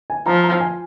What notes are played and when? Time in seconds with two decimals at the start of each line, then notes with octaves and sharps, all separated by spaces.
0.10 G#5
0.26 F3 A#5
0.44 A#5
0.60 G#5